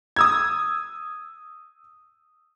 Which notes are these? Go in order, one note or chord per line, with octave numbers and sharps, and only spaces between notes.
D#6 E6 G#6